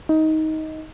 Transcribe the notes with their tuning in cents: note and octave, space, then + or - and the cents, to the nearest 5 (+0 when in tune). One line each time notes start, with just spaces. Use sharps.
D#4 +15